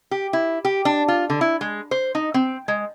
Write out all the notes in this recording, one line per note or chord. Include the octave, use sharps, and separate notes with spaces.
G4
E4
G4
D4
F4
D3
E4
G#3
C5
D#4
C4
G#3